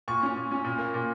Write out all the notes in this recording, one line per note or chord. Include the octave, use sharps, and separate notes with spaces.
A#2 C#6
C#4
A#2
C#4
A#2
A#3
A#2